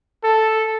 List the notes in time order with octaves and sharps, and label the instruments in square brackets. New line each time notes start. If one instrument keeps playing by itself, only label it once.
[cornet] A4